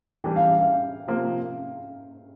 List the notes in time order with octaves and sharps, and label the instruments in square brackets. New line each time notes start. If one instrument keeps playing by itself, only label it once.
[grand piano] E3 G3 D4 [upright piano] G5
[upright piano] F5
E5
F5
[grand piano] C3 F3 A#3 F4